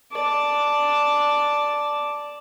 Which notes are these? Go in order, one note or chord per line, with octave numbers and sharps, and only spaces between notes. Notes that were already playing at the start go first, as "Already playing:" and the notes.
D5 A5